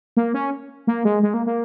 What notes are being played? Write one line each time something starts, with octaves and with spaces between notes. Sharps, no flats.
A#3
C#4
A#3
G#3
G#3
A#3
A#3